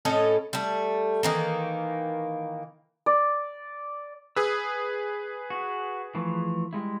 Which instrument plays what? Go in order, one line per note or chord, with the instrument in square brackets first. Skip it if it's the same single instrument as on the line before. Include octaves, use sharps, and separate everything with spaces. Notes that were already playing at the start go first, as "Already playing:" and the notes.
[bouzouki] A2 C#4 A4 D#5
G3 A3
D#3 E3 A#3
[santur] D5
[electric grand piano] G#4 B4 [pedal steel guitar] D#6 E6
[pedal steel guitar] F#4
E3 F3 A3
G3 G#3 E4